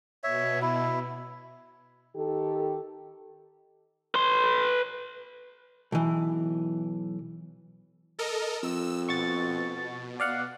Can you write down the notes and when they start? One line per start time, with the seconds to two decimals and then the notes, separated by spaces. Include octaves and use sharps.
0.24 B2 C#5 E5
0.62 E4
2.16 D#3 G4 A4
4.15 B4 C6
5.92 B1 E3
8.19 A4 A#4 D#5
8.63 F2 E6
9.09 B2 C#6 A6
10.20 D5 F5 F#5